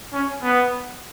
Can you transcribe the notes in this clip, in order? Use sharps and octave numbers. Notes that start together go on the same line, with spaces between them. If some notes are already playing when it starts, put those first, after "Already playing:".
C#4
B3